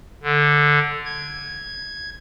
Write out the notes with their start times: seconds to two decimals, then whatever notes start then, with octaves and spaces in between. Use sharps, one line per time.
0.23 D3
1.06 G#6